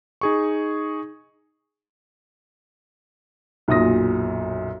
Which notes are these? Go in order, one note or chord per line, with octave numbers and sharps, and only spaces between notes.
D#4 G#4 C#6
B1 F#2 A#2 D#6 A#6